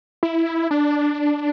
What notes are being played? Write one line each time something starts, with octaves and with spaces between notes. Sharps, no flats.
E4
D4